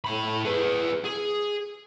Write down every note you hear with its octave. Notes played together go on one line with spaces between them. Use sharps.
A2 B5
G#4 B4
G#4